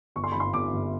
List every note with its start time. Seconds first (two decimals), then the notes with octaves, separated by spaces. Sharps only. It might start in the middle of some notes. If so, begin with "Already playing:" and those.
0.16 G1 C#6
0.24 C6
0.32 G1 B5
0.40 C6
0.53 G1 D6
0.72 G1